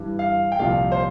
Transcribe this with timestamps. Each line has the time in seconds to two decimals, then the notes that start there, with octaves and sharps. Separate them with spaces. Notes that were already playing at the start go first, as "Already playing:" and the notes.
Already playing: G2 E3
0.19 F5
0.52 G5
0.59 C2 A#2 F3 F5
0.92 C5